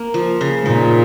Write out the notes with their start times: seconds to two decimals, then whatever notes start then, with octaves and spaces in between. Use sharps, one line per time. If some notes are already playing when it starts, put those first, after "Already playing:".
Already playing: A#3
0.14 F3
0.41 C#3
0.66 A#2 D#4